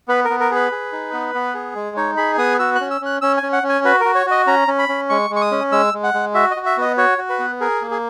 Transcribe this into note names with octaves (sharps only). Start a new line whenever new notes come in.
B3 B4
B3 A#4
A#4
G#4 B4
G#4
D#4
B3
B3
G#4
G#3
D#4 C#5
G#4 B5
B3 D#6
F#4 E6
F#6
C#4
E6
C#4 F#6
C#4 E6
G#5
C#4
F#5
C#4
G#5
F#4 B4
F#4 A#4
C#5
F#4
D#5
C#4 A#5
C#4
B5
C#4
G#3 C#6
G#3
C#6
D#6
C#4
G#3 E6
G#3
F#5
G#3
F#4 E5
D#5
F#4
E5
B3 D#5
F#4 C#5
F#4
B4
B3
G#4 A#4
A#3
G#4